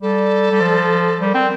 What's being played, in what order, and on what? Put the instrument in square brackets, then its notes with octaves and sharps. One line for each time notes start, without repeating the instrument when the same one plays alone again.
[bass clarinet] G3 [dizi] A4
[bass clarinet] G3
F3
[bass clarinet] G3 [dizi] C5
[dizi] A#4
[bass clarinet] C4